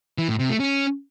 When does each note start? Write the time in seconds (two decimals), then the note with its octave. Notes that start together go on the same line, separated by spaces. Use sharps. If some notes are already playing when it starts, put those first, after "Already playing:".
0.18 E3
0.29 A2
0.39 C3
0.49 A3
0.60 C#4